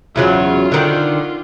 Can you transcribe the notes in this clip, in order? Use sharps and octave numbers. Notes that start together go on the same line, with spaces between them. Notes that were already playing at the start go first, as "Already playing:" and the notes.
E2 C#3 F#3 F4
D3 D#3